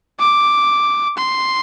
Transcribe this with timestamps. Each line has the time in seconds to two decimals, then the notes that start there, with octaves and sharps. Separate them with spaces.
0.19 D6
1.18 C6